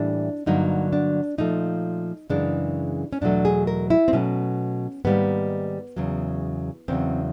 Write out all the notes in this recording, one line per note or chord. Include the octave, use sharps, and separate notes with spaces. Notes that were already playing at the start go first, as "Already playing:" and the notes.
Already playing: A2 E3 G3 A#3 D4
G2 D3 F#3 A#3 D#4
D4
A#2 F3 A3 D#4
F#2 C#3 E3 G#3 D4
C#4
E2 B2 F#3 A3 D4
G#4
A#4
E4
C4
B2 F#3 A3 C#4
G#2 D#3 G3 A#3 B3
E2 C#3 F#3
E2 C#3 F#3 C4